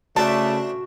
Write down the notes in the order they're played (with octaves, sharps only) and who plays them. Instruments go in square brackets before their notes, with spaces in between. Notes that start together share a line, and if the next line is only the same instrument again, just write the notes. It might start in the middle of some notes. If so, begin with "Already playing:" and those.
[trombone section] C#3 A3 [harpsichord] D4 C5 E5 [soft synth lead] F#4 [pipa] A5